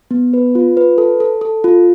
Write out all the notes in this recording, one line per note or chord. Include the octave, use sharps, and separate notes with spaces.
B3
B4
F4
B4
A4
A4
A4
F4